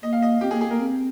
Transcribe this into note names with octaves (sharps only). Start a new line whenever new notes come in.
A#3 D#5
F5
D#5
C4 G4
A#3 G#4
G#4
A#3 A#4
C4